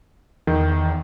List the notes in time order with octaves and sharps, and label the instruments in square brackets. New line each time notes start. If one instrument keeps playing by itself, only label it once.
[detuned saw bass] E2 [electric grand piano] D#3